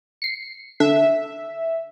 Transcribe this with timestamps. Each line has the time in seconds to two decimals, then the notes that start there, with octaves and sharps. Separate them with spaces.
0.22 C7 C#7
0.80 D3 E5